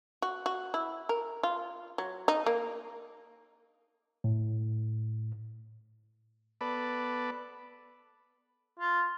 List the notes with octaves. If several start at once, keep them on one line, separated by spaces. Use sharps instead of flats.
F#4
F#4
E4
A#4
F4
F#3
D#4
A#3
A2
B3 A4 B4 D5
F4